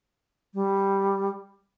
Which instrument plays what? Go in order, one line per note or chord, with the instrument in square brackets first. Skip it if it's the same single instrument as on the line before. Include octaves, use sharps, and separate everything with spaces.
[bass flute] G3